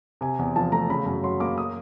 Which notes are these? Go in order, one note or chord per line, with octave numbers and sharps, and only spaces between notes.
C3 G#5
E2
F3 A5
A3 A#5
C#3 B5
F#2
F#3 C6
A#3 D6
D#6